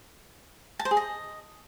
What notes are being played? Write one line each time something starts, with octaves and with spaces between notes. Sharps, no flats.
A5
C5
G#4
D#5